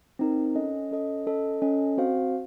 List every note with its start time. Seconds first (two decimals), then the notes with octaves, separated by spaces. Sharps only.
0.19 C4 D#4 A#4
0.55 C#4 A4 D#5
0.91 C#4 A4 D#5
1.26 C#4 A4 D#5
1.62 C#4 A4 D#5
1.98 C4 F#4 C5 F5